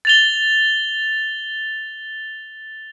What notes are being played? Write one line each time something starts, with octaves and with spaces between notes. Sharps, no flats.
A6 F7 G7